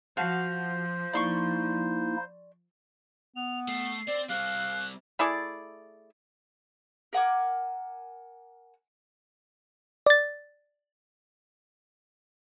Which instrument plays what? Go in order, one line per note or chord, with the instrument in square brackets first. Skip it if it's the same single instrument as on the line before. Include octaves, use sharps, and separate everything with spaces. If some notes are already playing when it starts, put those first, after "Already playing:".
[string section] F3 [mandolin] F#4 F5 A5 [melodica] C5
[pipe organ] A#3 D#4 E4 [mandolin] D5 C6 C#6
[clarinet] B3 [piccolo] F7
[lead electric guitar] A3 [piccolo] C7
[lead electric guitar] C4 [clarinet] D5
[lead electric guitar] G3 C4 [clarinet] F5 [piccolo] F#6
[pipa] A3 E4 G#4 D5
[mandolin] A#4 F#5 G#5 D6
[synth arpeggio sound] D5 A6